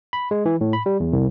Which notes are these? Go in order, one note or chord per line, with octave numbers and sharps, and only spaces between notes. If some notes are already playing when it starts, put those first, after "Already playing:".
B5
G#3
E3
A2
B5
G3
E2
C2